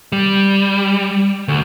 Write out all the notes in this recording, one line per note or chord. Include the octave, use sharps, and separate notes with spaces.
G3
D2